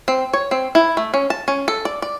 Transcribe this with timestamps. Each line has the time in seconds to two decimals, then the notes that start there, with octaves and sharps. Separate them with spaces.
0.08 C4
0.33 C#5
0.51 C4
0.75 E4
0.97 A3
1.14 C#4
1.30 A5
1.48 C#4
1.68 A4
1.85 D5
2.02 D5